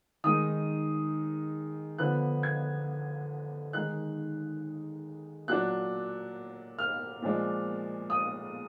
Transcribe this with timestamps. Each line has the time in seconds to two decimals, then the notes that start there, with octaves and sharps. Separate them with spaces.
0.24 D#3 G#3 D#4 D#6
1.98 D3 F3 B3 F#6
2.43 G#6
3.73 D#3 G#3 D#4 F#6
5.48 A#2 F#3 D4 F#6
6.79 F6
7.22 A#2 F3 G#3 D4
8.10 D#6